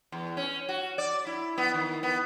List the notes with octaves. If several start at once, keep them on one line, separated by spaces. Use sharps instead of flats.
E2
C#4
F#4
D5
E4
B3
D#3
B3